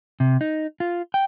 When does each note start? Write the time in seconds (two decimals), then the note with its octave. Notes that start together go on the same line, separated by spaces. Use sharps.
0.20 C3
0.41 D#4
0.80 F4
1.14 G5